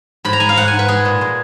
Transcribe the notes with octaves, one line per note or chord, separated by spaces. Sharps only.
G#2 B5
A#5
G#3 G#5
F5
G#2 F#5
G#5
G#2
B4
G#3 G#4
A#2
G#3